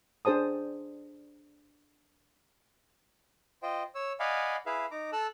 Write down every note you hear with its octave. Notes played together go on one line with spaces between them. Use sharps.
D4 G#4 C5 A5 D#6
F4 C5 D#5 G5
C#5 E6
D5 D#5 F5 F#5 G#5 B5
E4 G#4 B4 E5 F5
D#4 A#5 D6
A4 A5 E6 F#6